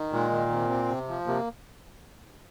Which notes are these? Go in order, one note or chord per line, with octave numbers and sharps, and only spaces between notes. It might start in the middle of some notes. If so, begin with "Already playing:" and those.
Already playing: D#3
A#2 G#3
D#3
C3
C4
C3
F3
C3 A#3